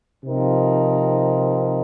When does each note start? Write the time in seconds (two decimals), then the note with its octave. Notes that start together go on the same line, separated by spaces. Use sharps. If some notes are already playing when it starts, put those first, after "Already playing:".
0.23 C3 F3 C4 D#4 A#4